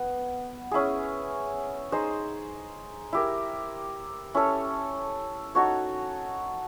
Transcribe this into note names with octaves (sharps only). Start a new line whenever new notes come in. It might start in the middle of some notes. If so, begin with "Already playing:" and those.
Already playing: B3
C#4 E4 G#4
D#4 G#4 C5
E4 G4 A#4
C#4 E4 A4 C#5
D#4 F#4 A4 C#5